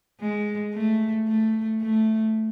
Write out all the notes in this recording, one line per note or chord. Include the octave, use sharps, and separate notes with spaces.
G#3
A3
A3
A3